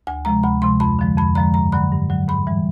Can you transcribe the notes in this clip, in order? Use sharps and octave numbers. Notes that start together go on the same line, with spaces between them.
D2 G#5
C3 F3 G#3 A#5
D2 B5
C3 F3 G#3 C6
F2 B5
D3 F3 G#3
F2 B5
D3 F3 G#3 A#5
G2 A#5
D3 F#3 B5
G2
D3 F#3
G#2 B5
E3 G3